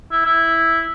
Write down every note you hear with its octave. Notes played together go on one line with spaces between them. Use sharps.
E4
E4